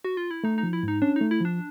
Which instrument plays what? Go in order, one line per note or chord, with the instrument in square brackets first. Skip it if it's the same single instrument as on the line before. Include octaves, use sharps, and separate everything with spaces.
[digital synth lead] F#4
F4
E4
[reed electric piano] A3 [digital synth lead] D#4
[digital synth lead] D#4
[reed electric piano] F3
[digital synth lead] E4
[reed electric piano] G#2 [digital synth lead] D#4
[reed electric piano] C#4 [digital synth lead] D4
[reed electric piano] A3 [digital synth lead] D#4
[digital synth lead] E4
[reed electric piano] F3 [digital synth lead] D4